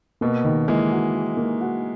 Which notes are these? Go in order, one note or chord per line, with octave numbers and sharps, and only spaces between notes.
B2 A#3
D#3
E3 G#3 A#3
F#4
F#4
A#3
F#4